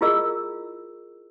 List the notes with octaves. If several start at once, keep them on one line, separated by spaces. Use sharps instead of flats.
E4 F4 G#4 A#4 D#5 E6